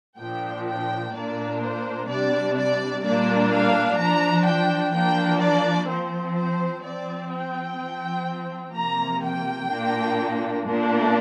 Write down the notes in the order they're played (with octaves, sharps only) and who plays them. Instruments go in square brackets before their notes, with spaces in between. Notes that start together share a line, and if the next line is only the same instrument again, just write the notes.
[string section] A#2 F3 D4 G5
G5
A#2 A#3 D4 D5
C5
C3 G3 D4 D5
D5
A#2 G3 A#3 D4 D5
F5
F3 D4 A#5
G5
F3 A#3 D4 G5
D5
F3 C4 C5
C5
F3 C4 D5
G5
F3 C4
C3 F3 A#3 A#5
G5
A#2 A#3 D4
A#2 A#3 D4